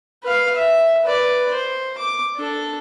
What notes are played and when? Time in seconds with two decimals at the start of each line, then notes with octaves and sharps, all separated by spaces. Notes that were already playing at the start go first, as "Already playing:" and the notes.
0.23 B4 F5
0.56 E5
1.04 B4 D5
1.53 C5
1.98 D6
2.36 D4 A4